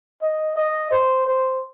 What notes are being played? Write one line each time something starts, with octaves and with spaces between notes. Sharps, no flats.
D#5
D#5
C5
C5